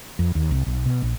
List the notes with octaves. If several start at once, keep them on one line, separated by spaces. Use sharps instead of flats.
F2
D#2
C2
B1
B2
A#1